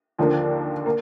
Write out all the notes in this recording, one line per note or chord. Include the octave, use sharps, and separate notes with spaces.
D#2 D3 F3 A#3 D4
A#3